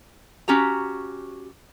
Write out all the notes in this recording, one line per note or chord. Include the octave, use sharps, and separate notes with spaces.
C#4 F#4 G4 A#5